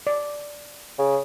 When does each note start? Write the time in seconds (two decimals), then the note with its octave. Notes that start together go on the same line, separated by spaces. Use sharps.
0.07 D5
0.99 C#3